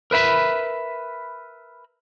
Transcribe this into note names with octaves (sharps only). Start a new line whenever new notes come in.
A#4 B4 E5 B5